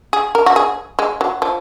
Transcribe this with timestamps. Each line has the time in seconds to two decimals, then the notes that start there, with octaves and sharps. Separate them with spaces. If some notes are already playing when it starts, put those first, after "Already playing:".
0.13 G#4
0.35 A#4
0.46 F#4
0.56 G#4
0.99 G#3
1.21 F#3
1.42 F3